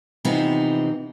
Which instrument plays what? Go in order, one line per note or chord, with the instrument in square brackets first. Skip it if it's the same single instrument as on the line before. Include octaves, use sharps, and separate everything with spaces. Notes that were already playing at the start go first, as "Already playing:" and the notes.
[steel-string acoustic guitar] C3 E3 F3 B3 D#4